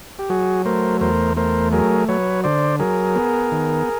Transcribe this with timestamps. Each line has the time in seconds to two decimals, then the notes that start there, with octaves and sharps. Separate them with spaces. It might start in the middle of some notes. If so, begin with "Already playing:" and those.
0.19 G4
0.30 F#3 F#4 G#4
0.65 A3 A#4 C5
1.01 E2 A#4 C5
1.37 A3 A#4 C5
1.72 F#3 G#4 A#4
2.09 F#3 B4 C#5
2.44 D3 C5 D5
2.79 F#3 G#4 A#4
3.15 B3
3.51 D#3